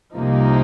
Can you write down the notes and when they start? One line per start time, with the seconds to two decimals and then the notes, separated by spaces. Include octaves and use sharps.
0.16 C2 C3 F3 A#3 D#4